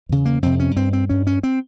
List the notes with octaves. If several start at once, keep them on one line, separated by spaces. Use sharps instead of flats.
E2 C#3
A#3
F2 C3 C4
C#4
G2 C4
C4
G2 C#4
C#4
C4